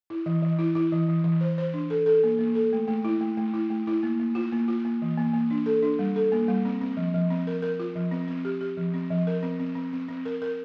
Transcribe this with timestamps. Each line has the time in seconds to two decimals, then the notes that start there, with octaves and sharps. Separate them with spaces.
0.10 E4
0.26 E3
0.43 E3
0.59 E4
0.75 E4
0.92 E3
1.08 E3
1.24 E3
1.41 C5
1.58 C5
1.74 D4
1.90 A4
2.06 A4
2.23 A#3
2.39 A#3
2.55 A4
2.73 A3
2.88 A3
3.05 E4
3.21 A3
3.37 A3
3.54 E4
3.70 A3
3.87 E4
4.03 A#3
4.20 A#3
4.35 F4
4.52 A#3
4.68 F4
4.85 A#3
5.02 E3
5.17 A#3
5.34 A#3
5.51 D4
5.66 A4
5.83 D4
5.99 G3
6.16 A4
6.32 A#3
6.48 G3
6.65 C4
6.81 C4
6.97 F3
7.14 F3
7.30 C4
7.47 A#4
7.62 A#4
7.80 F4
7.96 F3
8.12 C4
8.28 C4
8.45 G4
8.61 G4
8.77 F3
8.94 C4
9.11 F3
9.27 A#4
9.43 C4
9.59 C4
9.75 C4
9.93 C4
10.09 C4
10.25 A#4
10.42 A#4